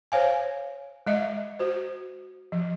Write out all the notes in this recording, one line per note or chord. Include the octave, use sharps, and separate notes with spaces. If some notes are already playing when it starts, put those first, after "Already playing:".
C5 C#5 F5 G#5
G#3 D#5 E5
F#4 C5
F3